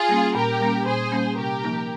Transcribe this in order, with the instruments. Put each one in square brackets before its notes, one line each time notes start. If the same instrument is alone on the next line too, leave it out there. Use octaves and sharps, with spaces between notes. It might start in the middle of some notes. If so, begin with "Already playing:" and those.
Already playing: [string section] F4 G#4
[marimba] G3 A#3 C#4
[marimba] A#2 [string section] G4 A#4
[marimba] G3 A#3 C#4
[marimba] A#2 [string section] G#4 C5
[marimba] G3 A#3 C#4
[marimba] C3 [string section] G4 A#4
[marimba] F3 A#3 D#4